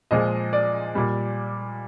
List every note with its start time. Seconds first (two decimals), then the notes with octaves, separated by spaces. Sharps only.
0.11 A#2 F3 G#3 D#5
0.53 D5
0.95 A#2 G3